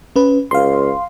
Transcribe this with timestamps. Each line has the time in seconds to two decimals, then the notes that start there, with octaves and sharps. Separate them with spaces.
0.16 C#4 B4
0.51 C#2 F5 C6